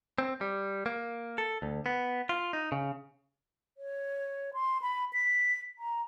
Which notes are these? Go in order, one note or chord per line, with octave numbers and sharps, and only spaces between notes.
C4
G3
A#3
A4
D2
B3
F4
D#4
C#3
C#5
C6
B5
B6
A#5